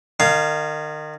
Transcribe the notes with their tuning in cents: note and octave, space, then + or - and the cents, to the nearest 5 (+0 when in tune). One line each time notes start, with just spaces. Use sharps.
D#3 -30 F5 -5